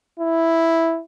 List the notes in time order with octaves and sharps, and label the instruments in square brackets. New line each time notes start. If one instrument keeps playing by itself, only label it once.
[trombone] E4